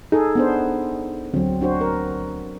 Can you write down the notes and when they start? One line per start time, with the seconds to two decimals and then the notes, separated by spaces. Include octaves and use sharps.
0.12 D#4 G#4 A4
0.35 B3 D4 C5
1.34 D2 F#3 C4
1.61 D4 F#4 C5
1.81 A#4